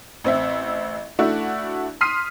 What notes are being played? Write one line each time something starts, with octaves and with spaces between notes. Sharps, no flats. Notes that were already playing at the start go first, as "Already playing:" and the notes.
A1 C4 E5
A3 D4 E4 F#4
C6 D#6 F6 B6 C7 D#7